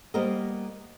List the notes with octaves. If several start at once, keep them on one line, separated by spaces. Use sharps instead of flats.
G3 A#3 B3 A#4 C5 D#5